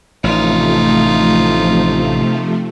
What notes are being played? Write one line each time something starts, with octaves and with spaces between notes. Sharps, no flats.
A1 C3 F3 A3 D#4 F4